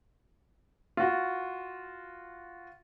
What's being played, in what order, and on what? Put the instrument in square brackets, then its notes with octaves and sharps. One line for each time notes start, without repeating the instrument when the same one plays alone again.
[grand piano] F4 F#4